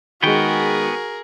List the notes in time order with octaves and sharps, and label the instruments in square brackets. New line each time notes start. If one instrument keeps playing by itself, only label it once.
[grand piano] D#3 G#3 [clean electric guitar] B3 G5 [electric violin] F#4 [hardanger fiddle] G#4 A#4